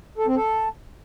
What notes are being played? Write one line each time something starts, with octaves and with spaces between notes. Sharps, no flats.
A4
C4
A4